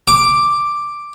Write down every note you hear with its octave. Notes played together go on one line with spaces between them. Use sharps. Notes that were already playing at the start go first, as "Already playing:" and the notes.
D6